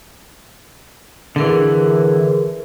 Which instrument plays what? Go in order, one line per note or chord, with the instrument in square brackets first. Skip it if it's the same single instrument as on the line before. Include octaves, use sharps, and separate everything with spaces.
[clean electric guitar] D3 E3 [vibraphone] G#4 A#4 B4